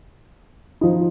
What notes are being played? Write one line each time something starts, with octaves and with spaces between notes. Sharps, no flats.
F3 D#4